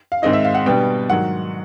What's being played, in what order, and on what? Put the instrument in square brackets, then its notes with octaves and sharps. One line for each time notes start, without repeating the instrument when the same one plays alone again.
[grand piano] F5
G#2 D#3 G#3 C4 D#4 D#5
E5
F5
F#5
B2 G3 B3 D4 G5
G#2 D#3 F#3 F#5